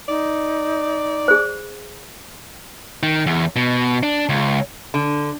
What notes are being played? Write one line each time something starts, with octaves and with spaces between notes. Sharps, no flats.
D#4 D5
G#4 C5
D#3
E2
B2
D4
C#2
D3